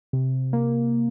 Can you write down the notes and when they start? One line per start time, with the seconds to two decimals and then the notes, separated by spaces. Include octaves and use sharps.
0.13 C3
0.53 A#3